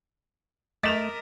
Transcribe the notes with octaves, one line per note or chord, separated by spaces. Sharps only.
A3 A#4 D#5 D6 A6 B6 E7 F7